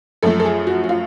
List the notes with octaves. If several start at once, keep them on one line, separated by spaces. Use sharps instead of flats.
F#2 F3 A3 A4
A4
G#4
F#4
F#4
F4